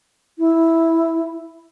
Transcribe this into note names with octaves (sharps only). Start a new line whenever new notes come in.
E4